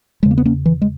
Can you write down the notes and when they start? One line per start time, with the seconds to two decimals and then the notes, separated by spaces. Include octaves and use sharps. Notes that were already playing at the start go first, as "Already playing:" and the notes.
0.23 E2 C#3 G#3
0.31 A#3
0.38 B3
0.45 A#3 C#4
0.66 E3
0.82 G#3